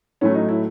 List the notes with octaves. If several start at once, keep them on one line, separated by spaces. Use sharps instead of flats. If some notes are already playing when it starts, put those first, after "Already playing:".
A2 F#3 A3 C#4
D#4
E4